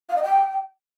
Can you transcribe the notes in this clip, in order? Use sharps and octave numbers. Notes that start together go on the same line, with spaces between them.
F5
D#5
G5